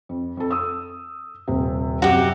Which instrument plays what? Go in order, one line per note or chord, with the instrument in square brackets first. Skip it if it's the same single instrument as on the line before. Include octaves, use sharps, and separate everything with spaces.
[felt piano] F2
F2 A4
D#6 E6
D#1 C3
[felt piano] F#2 C3 [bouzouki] F#4 G4